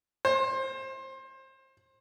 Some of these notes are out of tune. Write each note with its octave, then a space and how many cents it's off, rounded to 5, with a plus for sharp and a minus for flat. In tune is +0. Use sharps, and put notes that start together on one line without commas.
C5 +25